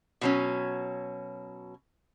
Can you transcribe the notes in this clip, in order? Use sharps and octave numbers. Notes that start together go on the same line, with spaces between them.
B2 F#3 C#4